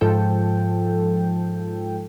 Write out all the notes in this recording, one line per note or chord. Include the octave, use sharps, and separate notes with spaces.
G#2 F3 A4 G5